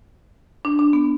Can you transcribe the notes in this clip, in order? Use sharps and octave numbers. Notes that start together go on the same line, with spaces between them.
D4
D4
B3